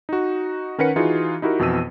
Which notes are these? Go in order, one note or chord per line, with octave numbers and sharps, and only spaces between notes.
D#4 F#4
D#3 C#4 A#4 B4 F#5 C#7
E3 D#4 F4 F#4 G#4
D#4 E4 F#4 G4 A#4
F2 B2 E3 B3 E6 D#7